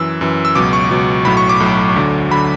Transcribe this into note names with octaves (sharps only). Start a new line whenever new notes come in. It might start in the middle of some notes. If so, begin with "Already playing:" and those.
Already playing: F#2 E3 E6
F#2 E3
E6
C#2 B2 F#3 D6
C#6
C#2 B2 F#3
B1 A2 F#3 B5
C#6
D6
B1 A2 F#3
D2 D3 F#3
D3 F#3 B5